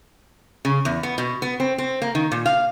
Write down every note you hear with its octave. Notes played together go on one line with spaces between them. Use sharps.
C#3
E2
B3
B2
B3
C4
C4
A#3
D#3
A#2
F5